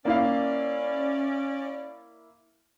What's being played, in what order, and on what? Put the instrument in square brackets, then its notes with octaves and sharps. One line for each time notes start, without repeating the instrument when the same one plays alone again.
[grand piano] A#3 E4 F5 [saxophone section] C#4 D5